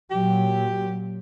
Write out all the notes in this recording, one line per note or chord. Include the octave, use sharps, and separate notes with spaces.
A#2 F#3 G4